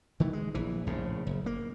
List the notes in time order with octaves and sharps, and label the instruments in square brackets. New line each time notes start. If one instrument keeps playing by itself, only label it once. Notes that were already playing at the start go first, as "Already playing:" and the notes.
[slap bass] D#3 E3 A3
G#3
A#1 E3
A#1 A2 C#3
F#1
A#3